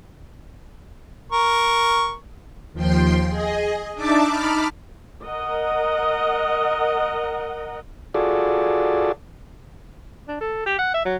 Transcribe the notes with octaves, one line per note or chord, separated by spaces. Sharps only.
A#4 C#6
D#2 F3 G5 C6
G#4 D#5
D4 D#4 D5 E5 A5 D6
D#4 A5 B5 D6 F6
A#4 D#5 F#5
F4 F#4 G#4 A4 D5
D4
A4
G4
F#5
E5
F#3